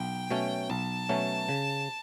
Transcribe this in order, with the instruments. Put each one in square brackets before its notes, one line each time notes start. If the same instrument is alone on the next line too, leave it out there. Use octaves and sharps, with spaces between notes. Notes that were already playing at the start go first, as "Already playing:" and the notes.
Already playing: [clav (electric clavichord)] B1 [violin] G5
[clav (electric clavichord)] B2 F#3 A3 C#4
[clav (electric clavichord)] B1 [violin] A5
[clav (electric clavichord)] B2 F#3 A3 C#4
C#3